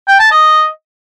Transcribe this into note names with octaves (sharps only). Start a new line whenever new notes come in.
G5
A5
D#5